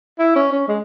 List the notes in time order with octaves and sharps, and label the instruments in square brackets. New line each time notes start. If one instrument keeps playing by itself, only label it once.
[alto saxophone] E4
C#4
C#4
G#3